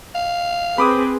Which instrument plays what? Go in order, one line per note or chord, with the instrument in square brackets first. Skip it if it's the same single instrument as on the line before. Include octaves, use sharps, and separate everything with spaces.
[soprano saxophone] F5
[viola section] C4 G#4 B4 [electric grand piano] B5 D6 D#6